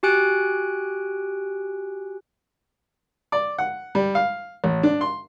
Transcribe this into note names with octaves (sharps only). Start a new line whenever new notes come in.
F#4 G4 G#5 F#6 D7
D5
F#5
G3
F5
A1
D4
C6